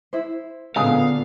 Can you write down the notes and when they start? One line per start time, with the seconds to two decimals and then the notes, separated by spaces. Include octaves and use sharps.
0.13 E4 C5
0.76 C#2 A#2 D3 B3 G#4 F5